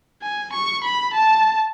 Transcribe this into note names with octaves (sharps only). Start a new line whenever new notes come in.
G#5
C#6
B5
A5